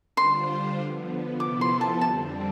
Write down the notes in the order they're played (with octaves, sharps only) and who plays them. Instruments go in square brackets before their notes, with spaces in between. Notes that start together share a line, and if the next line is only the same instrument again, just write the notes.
[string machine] D3 G3 D4 F4 C5 [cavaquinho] C6
[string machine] D3 F3 B3
[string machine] C3 F3 B3 E4 A4 [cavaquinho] D6
[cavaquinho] C6
A5
[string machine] F2 D3 G3 C4 [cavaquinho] A5